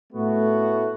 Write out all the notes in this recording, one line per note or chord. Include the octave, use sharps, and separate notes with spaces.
A2 A3 B3 F#4